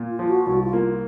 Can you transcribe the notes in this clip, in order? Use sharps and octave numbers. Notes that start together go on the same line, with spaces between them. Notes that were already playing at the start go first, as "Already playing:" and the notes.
Already playing: A#2
F4
F3
F#4
C2 F#4
F4
A#3